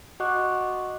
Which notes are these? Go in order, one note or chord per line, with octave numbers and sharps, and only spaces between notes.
F#4 D#5 F#5 C#6 D6 F#6